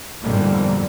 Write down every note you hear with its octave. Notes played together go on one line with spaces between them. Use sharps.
F2 G#2 B2 D3 G3 A#3